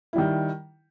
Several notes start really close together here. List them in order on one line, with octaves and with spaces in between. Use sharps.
E4 G3 D#3